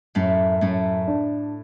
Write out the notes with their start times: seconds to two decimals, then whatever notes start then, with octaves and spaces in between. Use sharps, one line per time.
0.15 F#2 A2 A3
0.61 F#2 A2 A3
1.07 D4